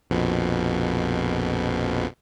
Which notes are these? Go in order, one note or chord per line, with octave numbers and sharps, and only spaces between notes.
A#1 F2 B2